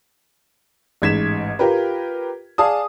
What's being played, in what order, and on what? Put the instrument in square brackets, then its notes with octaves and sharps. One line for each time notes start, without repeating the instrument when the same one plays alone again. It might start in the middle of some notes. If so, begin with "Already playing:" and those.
[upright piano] A1 G#2 G#6 B6 E7
F4 G4 A#4 B4
G#4 D5 F5 G#5 A5 D#6